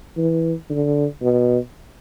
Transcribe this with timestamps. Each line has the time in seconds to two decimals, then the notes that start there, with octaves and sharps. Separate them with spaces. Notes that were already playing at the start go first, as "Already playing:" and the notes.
0.17 E3
0.70 D3
1.22 B2